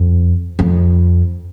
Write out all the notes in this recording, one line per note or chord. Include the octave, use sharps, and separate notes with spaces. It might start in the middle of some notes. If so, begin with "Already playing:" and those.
Already playing: F2
F2